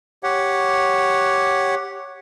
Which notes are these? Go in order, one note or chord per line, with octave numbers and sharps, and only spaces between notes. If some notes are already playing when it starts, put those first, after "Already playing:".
G4 C#5 F#5